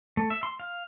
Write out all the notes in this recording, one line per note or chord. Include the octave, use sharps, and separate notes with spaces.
A3
E5
C6
F5